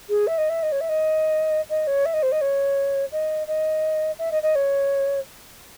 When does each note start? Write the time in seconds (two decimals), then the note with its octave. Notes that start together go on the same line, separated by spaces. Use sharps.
0.09 G#4
0.27 E5
0.38 D#5
0.50 E5
0.63 D#5
0.72 C#5
0.81 E5
0.89 D#5
1.70 D#5
1.87 C#5
2.05 E5
2.14 D#5
2.23 C5
2.32 D#5
2.41 C#5
3.12 D#5
3.47 D#5
4.19 E5
4.32 D#5
4.43 D#5
4.55 C#5